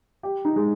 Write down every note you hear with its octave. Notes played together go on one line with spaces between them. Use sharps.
G4
D#4
G#3